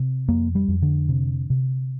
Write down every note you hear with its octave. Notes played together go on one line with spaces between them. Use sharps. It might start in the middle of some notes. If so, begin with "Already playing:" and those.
Already playing: C3
F2 A#3
G3
F2
D3
C3
C3